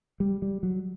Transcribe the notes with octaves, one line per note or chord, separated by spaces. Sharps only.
G3
G3
F#3